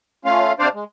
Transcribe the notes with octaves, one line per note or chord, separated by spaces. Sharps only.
A3 C#4 F4 F5
C3 D4 C5 D5 F5
G#3